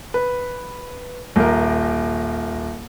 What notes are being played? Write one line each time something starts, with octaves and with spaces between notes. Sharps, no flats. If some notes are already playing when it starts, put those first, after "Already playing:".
B4
D#1 A#4